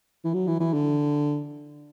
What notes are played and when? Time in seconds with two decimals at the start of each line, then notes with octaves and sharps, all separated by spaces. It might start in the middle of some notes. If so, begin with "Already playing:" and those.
0.24 E3
0.34 F#3
0.47 E3
0.60 E3
0.73 D3